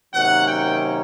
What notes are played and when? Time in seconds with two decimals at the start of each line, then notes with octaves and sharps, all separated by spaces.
0.14 C3 D#3 F#3 A#3 C#4 F#5
0.48 G5